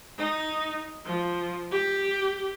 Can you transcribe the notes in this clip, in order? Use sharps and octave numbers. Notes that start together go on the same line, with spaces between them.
D#4
F3
G4